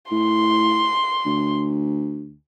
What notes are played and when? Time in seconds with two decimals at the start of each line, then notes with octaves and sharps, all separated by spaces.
0.11 A2 C6
1.25 D2